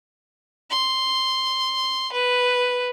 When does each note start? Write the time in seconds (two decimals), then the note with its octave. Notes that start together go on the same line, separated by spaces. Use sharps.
0.71 C6
2.12 B4